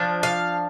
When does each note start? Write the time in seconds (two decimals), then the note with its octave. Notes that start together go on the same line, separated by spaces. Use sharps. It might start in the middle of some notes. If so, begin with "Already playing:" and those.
Already playing: F3 D4
0.23 F5